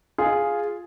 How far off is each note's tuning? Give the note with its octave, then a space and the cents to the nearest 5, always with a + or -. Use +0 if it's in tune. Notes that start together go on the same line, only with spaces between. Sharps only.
F4 +0 G#4 +0